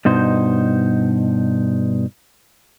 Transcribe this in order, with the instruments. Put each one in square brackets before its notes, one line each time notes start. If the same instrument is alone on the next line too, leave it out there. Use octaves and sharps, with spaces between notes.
[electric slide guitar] G2 B2 D#4 C5